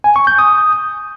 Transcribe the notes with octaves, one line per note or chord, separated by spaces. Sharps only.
G#5
C#6
G6
D#6